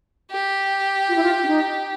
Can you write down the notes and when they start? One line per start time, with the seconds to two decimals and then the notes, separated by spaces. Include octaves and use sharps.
0.31 G4
1.09 F4
1.16 E4
1.23 F4
1.43 D4
1.48 D#4